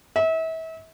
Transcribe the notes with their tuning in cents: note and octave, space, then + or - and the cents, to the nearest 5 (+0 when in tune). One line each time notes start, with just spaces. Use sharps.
E5 -35